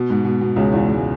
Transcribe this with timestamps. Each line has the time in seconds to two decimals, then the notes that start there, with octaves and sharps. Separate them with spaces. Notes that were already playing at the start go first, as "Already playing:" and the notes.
Already playing: B2
0.10 G#2
0.25 B2
0.41 B2
0.56 C#2 C#3
0.72 E2 E3
0.88 G#2 G#3